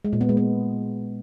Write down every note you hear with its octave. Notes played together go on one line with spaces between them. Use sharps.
G#3
A#2
B3
G#3
B3